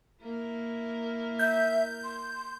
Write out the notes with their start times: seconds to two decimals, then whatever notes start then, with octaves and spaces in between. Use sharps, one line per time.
0.21 A#3 E4 A#4
1.39 E5 G6
2.04 C6